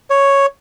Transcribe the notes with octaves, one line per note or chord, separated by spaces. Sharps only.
C#5